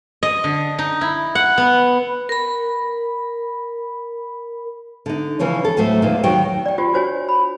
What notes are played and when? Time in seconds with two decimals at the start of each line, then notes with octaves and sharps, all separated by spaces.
0.23 D#5
0.44 D3
0.79 D#4
1.01 E4
1.35 F#5
1.58 B3
2.29 A#4 B5
5.06 D3 D#4
5.39 C#3 E3 F3 C#4
5.65 A4
5.77 D2 A2 F#3 A3 C5
6.02 E2 A#2 D#3
6.23 D#2 D#3 F#3 F#4 D#5 G5
6.66 D5 G5
6.78 F4 G4 C5
6.93 D4 F#4 C5 C#5 G#5
7.29 B5